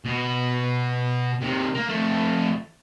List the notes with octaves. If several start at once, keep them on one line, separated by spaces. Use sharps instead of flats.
B2
C3 D#3
A#3
F2 A3